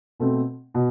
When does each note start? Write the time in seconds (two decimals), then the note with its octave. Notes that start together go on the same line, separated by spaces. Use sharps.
0.20 B2 A3 C4
0.74 B2